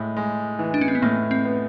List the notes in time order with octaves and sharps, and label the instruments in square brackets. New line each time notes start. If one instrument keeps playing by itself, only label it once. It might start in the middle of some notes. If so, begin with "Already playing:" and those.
Already playing: [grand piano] A2 G#3
G#3
E3
[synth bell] D4
C#4
C4
B3
[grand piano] A2 [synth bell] A#3
[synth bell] C4
[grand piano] B3